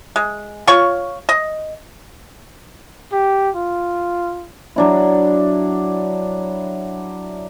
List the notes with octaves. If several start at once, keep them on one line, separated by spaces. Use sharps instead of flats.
G#3
F4 C#5 C#6
D#5
G4
F4
F#3 D4 E4